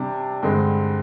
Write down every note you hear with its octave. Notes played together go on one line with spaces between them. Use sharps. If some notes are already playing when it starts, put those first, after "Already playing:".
Already playing: C3 G3 D4
G2 D3 G#3 C4